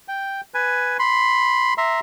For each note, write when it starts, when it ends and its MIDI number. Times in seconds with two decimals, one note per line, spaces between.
0.08 0.41 79
0.54 0.97 71
0.54 0.97 80
0.99 1.74 83
0.99 1.74 84
1.78 2.00 76
1.78 2.00 82
1.78 2.00 84